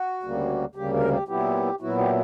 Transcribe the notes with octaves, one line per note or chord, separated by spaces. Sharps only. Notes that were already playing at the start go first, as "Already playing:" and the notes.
Already playing: F#4
D2 C#3 G3 A#3
D2 C#3 G3 A#3 G4
A#4
G4
A#2 F#3 B3 E4 G4
A#2 F#3 B3 E4 F#4
G4